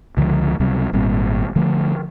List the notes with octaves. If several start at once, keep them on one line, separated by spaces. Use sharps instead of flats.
C#2 D3 F3 G#3
C#2 C3 F#3 G3
G#1 A#2 G3 C4
D3 F3 A3